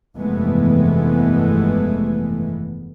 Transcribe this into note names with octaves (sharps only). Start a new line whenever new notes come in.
F1 G2 E3 G#3 A3 B3